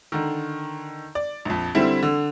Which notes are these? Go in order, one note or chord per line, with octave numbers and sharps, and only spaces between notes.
D3 D#3
D5
A#1 F2
D3 G3 C4 E4
D3